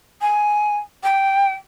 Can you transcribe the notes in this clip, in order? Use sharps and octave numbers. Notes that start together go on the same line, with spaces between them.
G#5
G5